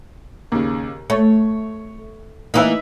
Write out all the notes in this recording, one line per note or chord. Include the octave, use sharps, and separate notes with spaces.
D#2 C#3
A3 C#5
E3 A#3 D#4 B4 E5